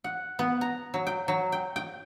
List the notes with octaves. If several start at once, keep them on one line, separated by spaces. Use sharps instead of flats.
F#5
B3
A#5
F#3
G5
F#3
G5
G5